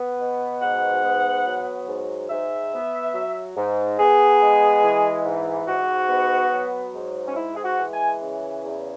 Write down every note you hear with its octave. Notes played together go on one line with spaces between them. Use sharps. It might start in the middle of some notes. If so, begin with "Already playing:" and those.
Already playing: B3
B2
G#2 F#5
B3
F#3
G#2
G#2 E5
B3
F#3
G#2
B3 G#4
G#3
E3
G#2
G#2 F#4
B3
F#3
G#2
C#4
G#3 E4
G#4
F#4
E3
G#5
C#3
E2